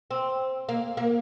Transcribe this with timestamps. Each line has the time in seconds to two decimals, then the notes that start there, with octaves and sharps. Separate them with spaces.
0.11 C4
0.69 A#3
0.97 A#3